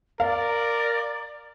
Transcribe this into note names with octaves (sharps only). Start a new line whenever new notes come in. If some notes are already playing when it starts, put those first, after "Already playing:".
A#4 D5 F5